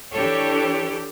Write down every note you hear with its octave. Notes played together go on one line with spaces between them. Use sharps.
E3 D4 G4 A4 C#5